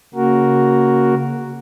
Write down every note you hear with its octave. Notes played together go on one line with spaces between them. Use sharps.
C#3 A#3 F#4 A#4